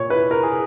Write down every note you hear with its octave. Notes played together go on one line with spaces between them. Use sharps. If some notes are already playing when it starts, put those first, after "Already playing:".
Already playing: A#2 C#5
E4 B4
A#4
G#4